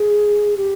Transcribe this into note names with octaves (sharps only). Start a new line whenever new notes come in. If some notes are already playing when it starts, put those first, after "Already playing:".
Already playing: G#4
G4